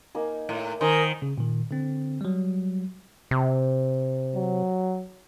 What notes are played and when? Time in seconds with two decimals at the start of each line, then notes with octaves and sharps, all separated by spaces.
0.15 A#3 D#4 G#5
0.49 A2
0.81 D#3 A#4 C5 G#5 D#6
1.22 C#3
1.38 A#2 D#3
1.71 D3 C4
2.21 F#3 G3
3.31 C3
4.36 F#3